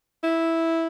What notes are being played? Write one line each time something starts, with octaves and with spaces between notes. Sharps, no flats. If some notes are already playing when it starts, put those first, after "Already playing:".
E4